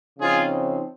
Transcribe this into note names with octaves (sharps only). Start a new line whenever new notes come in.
C#3 F3 C4 D#4 F4 G#4